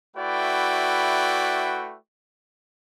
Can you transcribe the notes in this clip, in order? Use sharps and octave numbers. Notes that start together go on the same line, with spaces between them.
A3 E4 F#4 B4 D5 G5